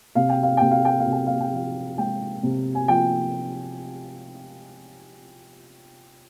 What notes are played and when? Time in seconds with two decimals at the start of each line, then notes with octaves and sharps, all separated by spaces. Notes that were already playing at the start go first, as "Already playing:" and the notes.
0.15 C3 F5
0.29 G5
0.43 F5
0.57 C3 G5
0.71 F5
0.85 G5
1.00 F5
1.06 C3
1.12 G5
1.27 F5
1.41 G5
1.52 F3 F5
1.98 G#3 G5
2.43 C3
2.75 G#5
2.88 F3 G5